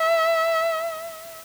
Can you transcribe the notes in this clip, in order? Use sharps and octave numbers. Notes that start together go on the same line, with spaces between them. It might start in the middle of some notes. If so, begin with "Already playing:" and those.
Already playing: E5